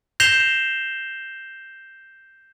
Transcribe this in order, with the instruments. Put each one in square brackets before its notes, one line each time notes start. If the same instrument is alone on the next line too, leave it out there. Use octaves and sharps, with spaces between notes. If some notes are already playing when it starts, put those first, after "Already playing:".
[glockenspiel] G6 A#6 C7 E7 F7 G7